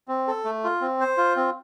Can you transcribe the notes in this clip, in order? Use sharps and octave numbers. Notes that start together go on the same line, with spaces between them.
C4
A4
A3
F4
C4
C5
F4
C4